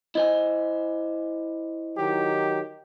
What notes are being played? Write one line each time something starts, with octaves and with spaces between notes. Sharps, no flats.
E4 C5 D#5 G#5
D#3 F#3 G4